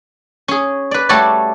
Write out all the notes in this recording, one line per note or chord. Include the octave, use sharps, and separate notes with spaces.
C#4 G#4
B4 D5
G3 A3 F#4 A4 C#5 D5